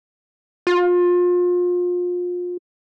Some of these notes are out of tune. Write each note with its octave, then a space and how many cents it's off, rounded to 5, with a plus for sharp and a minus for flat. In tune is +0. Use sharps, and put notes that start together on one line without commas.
F4 +30